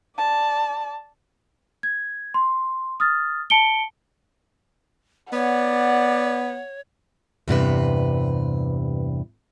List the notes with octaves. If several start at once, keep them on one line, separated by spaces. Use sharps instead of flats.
D5 A5
G#6
C6
D#6 F6 A6
A5 C#7 D7 G7
B3 C#5 D5 F#5
E2 G2 C3 B4